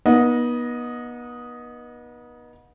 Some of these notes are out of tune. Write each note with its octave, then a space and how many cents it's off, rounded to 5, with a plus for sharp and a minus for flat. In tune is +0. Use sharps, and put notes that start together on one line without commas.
B3 -30 D#4 +0 D#5 +0